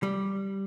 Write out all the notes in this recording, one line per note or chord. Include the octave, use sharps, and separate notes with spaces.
G3